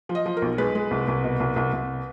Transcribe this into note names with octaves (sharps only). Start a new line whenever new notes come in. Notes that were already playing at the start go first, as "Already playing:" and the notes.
F3
D#5
F3
A#4
B1
G#3 B4
G#3
C2
C2
B2
C2
C2
C2